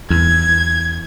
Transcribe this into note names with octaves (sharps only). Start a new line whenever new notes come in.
E2 G#6